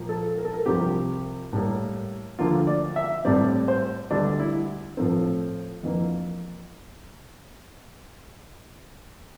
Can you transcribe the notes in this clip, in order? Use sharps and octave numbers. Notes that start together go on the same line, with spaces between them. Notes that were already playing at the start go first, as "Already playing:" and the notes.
Already playing: A#2 F3 A#3
A4
A#4
A4
A#4
C2 C3 F3 C4 G4
A2 G3 A#3
D2 D3 F3 A#3 F4
D5
E5
A2 G3 C4 D5
C5
D2 D3 G3 D4
E4
A2 F3 A3 C4
F2 E3 A#3